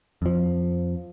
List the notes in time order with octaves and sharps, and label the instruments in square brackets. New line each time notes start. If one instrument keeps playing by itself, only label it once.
[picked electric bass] F2 F3